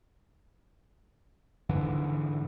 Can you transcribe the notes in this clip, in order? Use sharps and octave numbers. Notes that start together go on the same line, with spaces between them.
G#2 D3 E3